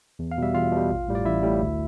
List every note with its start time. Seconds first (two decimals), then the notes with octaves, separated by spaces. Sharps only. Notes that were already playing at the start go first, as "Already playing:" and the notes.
0.19 E2
0.31 F5
0.38 B2 G3 E5
0.54 E2 F4 F5
0.72 B2 G3
0.90 A1
1.08 A2 G3
1.15 D5
1.25 A1 E4 E5
1.43 A2 G3
1.61 D2